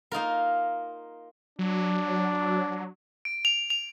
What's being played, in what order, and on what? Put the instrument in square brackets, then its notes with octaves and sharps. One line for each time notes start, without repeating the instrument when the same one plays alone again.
[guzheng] A#3 D#4 F4 A#4
[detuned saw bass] F#3 [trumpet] D4
[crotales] D7
F7
F7